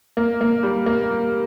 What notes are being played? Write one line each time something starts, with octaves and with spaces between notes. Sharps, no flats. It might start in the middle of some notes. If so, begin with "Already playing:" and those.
A#3
A#3
G3
A#3